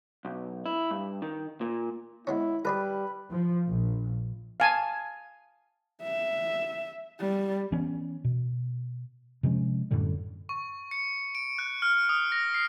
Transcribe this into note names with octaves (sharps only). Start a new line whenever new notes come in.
B1
E4
G2
D#3
A#2
G#3 B3 C#4 E4
G3 G#4 B4 D5 A#5
F3
A#1
F5 G#5 A5
E5
G3
E3 B3 C#4
B2
C3 F3 G#3 C#4
F#2 A2 D3 G3
C#6
C#7
D7
F#6
F6
D#6
A#6
C7